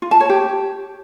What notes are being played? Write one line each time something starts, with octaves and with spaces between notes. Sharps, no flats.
F4
A5
C#5
G4